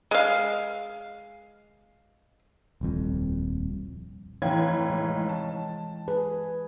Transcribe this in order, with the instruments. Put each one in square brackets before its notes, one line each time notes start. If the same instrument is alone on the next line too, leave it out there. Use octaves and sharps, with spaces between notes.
[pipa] G#3 F5
[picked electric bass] D#1 C2 F2
[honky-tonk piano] F1 A2 G#6 [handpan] E3 [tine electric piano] C#5 F5 G5
[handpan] G#3
[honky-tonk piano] A5
[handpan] G#4 [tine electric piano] B4